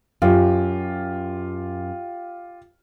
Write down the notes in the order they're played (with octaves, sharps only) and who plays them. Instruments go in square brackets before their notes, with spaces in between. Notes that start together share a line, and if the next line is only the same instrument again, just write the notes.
[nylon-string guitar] F#2 [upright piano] F4 G4